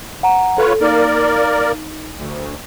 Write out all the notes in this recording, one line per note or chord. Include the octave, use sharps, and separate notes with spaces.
F#5 A#5
F4 A4 B4 C#5
A#3 D#4 A#4 D5
D2